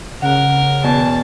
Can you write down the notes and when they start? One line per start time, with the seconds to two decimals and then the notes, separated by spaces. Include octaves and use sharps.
0.22 C#3 A#4 F#5
0.84 E2 B2 A5